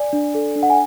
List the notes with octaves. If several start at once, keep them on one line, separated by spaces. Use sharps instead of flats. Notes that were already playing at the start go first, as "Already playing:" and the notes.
Already playing: D5 G#5
D4
A4
D4
F#5
G#5